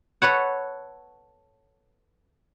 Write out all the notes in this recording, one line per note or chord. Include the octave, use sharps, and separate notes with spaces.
A4 B4 C#5 F#5